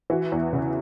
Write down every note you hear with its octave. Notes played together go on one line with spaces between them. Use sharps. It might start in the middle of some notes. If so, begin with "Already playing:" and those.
E3 F#4
E2
C#3